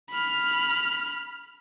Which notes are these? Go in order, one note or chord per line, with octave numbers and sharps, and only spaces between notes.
B5 F6